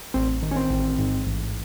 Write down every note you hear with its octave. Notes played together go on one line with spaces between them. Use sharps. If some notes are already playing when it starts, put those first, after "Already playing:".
A1 C4
D#3
C#4
C4
A1
G#2
A1